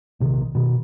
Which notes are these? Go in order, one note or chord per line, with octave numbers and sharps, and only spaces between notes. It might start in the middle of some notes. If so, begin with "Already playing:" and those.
A#1 C3 D#3
B2 D#3